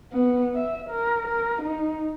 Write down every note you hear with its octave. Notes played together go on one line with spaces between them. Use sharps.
B3
E5
A#4
A#4
D#4